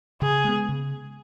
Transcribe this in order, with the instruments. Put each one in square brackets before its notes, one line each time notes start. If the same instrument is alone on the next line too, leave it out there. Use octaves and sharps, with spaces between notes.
[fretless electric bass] C#3 [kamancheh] G#4
[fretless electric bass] G#3 B3
C#3